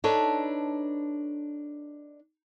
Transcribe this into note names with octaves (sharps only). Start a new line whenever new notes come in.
D4 D#4 A4 B4 C#5